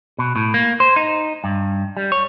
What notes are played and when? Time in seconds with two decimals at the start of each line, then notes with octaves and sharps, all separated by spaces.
0.19 B2
0.36 A2
0.54 A#3
0.80 C5
0.96 D#4
1.44 G2
1.97 G3
2.12 C#5